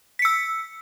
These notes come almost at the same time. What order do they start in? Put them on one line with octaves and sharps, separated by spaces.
B6 C#7 E6